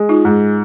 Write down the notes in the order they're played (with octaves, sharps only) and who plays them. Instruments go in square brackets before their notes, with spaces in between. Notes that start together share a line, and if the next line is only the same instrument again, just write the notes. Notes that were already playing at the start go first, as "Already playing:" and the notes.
Already playing: [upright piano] G#3
[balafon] D#4 F4
[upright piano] G#2